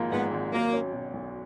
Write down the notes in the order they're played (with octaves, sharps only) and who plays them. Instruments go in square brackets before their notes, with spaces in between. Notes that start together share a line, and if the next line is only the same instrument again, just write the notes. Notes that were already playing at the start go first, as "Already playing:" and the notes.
Already playing: [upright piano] G#1 G#2 F3 A#3
[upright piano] G#2 [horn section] B3
[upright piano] G#1
[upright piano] F#3 [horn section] A#3
[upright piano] C#4
B2
B1